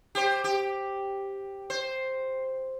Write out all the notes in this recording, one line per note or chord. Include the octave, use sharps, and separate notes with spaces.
G4 C5
G4
C5